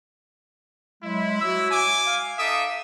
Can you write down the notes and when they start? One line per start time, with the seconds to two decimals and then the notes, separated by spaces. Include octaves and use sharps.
1.03 F#3 G#3 E4
1.42 F#4 C#5 E6
1.71 G#5 D6
2.07 F5
2.39 D#4 A4 E5 F5 D6 D#6